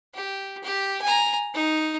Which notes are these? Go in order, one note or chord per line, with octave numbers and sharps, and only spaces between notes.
G4
G4
G#5 A#5
D#4